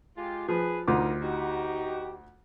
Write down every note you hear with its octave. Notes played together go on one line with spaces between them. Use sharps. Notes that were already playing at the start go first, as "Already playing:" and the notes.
G#3 F4 G4
F3 G#4 B4
D2 D#3 D#4 F4 D6
D#4 F#4 G4